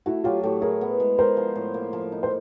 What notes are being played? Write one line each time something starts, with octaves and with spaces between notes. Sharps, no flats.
A3 E4 F#4
F#3 F4 G4
A2 G4 A4
E4 G#4 A#4
B3
G#3
G#3 A#4 C5
F3
A2
A#3
F3
D#4
C5